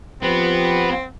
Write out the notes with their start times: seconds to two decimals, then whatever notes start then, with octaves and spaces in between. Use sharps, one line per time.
0.23 F3 B3 C4 G4